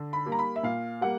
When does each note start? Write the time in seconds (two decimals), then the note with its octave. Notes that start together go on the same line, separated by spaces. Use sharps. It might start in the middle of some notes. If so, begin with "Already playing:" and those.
Already playing: D3
0.13 B5
0.26 G3 A#3
0.32 A#5
0.39 B5
0.56 E5
0.63 A#2 F5
1.01 G3 A#3 F#5